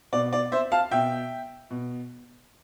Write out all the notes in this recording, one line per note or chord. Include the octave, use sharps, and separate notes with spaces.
B2 D5
D5
C5 E5
F5 A5
B2 E5 G5
B2